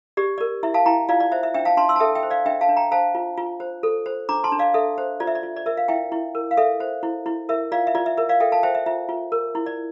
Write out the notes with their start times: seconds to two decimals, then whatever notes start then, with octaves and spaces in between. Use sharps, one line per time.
0.17 G4 D5
0.38 A#4 D5
0.63 E4 E5
0.74 F5 A5
0.86 E4 G5 A#5
1.09 F4 D5 F5
1.20 D5
1.32 C5 E5
1.43 E5
1.54 D4 E5 G5
1.65 F5 A5
1.77 D4 A5 C6
1.89 C6 E6
1.96 A5
2.00 A4 E5 G5
2.15 E5 G5
2.23 C5
2.30 D5 F5
2.46 D4 E5 G5
2.61 F5 A5
2.69 D4
2.77 G5 A#5
2.91 C5 F5 A5
3.15 F4
3.37 F4
3.60 C5
3.83 A4
4.06 C5
4.29 D4 A#5 D6
4.44 A5 C6
4.52 D4
4.59 D5 F5
4.74 A4 E5
4.98 C5
5.20 F4 D5
5.27 E5
5.35 D5
5.43 F4
5.56 D5
5.66 A#4 E5
5.77 F5
5.88 E4 E5 G5
6.12 E4
6.35 A#4
6.51 F5
6.57 A4 E5
6.80 C5
7.03 E4
7.26 E4
7.49 A#4 E5
7.72 F4 D5 F5
7.87 E5
7.95 F4 D5
8.06 E5
8.17 A#4 E5
8.29 D5 F5
8.40 A4 E5 G5
8.52 F5 A5
8.63 C5 E5 G5
8.75 E5
8.86 F4 E5
9.09 F4
9.32 A#4
9.55 E4
9.66 D5